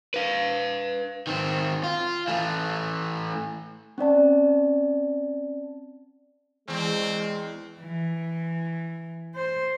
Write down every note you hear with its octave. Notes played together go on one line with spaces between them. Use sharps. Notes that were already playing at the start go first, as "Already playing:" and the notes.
B4 F5
D#3 C4
F4
E3 A3
C4 C#4 D5 A5
E2 G#3 C4
E3
C5